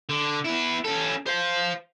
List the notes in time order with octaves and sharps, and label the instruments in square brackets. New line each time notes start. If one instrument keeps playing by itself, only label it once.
[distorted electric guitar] D3
B3 E4
C#4 A4
C5 F5